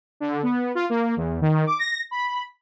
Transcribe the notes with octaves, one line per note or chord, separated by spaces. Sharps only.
D3
B3
F4
A#3
E2
D#3
D6
A#6
B5